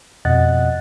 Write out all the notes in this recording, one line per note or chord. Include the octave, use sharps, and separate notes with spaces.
F2 B2 D#5 F#5 F#6 A6